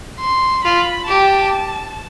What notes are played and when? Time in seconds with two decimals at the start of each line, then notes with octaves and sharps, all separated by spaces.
0.20 C6
0.64 F4 B5
1.07 G4 A5